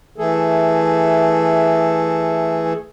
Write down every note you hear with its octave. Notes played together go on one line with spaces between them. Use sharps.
E3 A3 G#4 A4